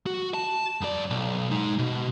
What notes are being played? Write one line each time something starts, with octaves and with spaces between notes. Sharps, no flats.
F#4
A5
F#2 D5
B1
G#3 D#4
B2